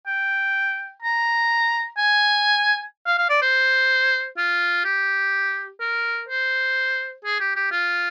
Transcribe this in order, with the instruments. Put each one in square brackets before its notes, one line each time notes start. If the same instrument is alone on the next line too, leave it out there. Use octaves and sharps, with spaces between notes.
[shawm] G5
A#5
G#5
F5
F5
D5
C5
F4
G4
A#4
C5
G#4
G4
G4
F4